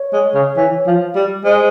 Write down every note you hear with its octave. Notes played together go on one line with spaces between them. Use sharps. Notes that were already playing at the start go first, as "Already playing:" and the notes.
Already playing: C#5
G#3
C#3
E3
F3
G3
G#3 C5